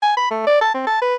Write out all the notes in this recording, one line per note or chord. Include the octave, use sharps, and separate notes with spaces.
G#5
B5
A3
D5
A5
C4
A5
B4